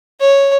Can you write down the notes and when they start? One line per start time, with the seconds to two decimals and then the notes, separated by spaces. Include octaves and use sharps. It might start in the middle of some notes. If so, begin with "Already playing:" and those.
0.20 C#5